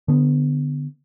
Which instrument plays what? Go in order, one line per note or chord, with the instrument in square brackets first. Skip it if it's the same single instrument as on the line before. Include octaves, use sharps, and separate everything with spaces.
[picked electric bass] D3 B3